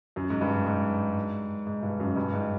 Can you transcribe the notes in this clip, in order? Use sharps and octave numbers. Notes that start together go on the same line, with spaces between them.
F#2
G#2
G2
G#2
G#2
G2
F#2
G2
G#2